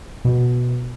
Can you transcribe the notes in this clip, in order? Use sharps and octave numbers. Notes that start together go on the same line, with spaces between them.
B2